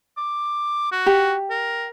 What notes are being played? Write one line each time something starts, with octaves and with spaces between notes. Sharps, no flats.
D6
F#4
G4
A#4